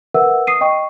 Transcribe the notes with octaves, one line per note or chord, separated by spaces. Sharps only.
A#4 B4 E5 F#5 E6
D#6 C7 D#7
D#5 G5 C#6